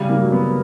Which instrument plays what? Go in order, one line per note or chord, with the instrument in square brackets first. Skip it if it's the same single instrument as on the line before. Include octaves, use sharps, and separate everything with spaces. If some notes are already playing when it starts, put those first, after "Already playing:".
Already playing: [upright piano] C#3 G3
A#3
F#3
B3